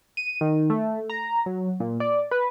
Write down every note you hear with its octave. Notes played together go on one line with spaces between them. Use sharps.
D#7
D#3
A3
A#5
F#3
A#2
D5
B4